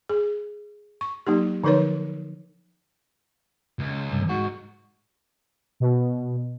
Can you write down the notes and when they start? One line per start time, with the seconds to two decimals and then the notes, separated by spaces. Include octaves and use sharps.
0.09 G#4
1.01 C#6
1.26 F#3 A#3 D#4 G4
1.64 D3 F3 D#4 A#4 B4 C#5
3.79 C#2
4.10 C2 G2
4.29 G#2 F#4
5.80 B2